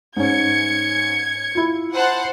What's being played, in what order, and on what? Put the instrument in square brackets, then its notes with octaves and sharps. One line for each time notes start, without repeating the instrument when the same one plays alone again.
[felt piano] G#2 C#4 [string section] G#6 C#7
[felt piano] E4 F4
[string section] C5 F#5 A5